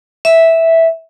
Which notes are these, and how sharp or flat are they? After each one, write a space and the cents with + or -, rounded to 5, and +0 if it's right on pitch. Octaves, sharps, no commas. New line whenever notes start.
E5 -5